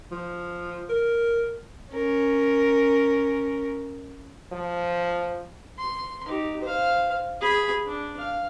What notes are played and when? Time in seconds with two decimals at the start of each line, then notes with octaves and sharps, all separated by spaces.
0.11 F3
0.89 A#4
1.93 C#4 A#4
4.52 F3
5.79 C6
6.26 D#4 G4
6.61 C5 F5
7.41 G#4 B5
7.86 D4
8.18 F5